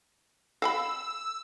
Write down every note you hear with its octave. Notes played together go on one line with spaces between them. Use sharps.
F5 G5 B5 E6